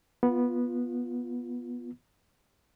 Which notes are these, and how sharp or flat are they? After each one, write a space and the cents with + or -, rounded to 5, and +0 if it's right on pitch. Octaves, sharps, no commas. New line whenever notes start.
B3 -15 F4 +0